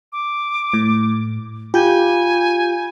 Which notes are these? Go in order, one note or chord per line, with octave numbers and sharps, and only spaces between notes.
D6
A2
F4 G4 G#5 G6